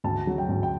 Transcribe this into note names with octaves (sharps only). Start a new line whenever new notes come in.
D2 A5
F#3
G5
D2
G5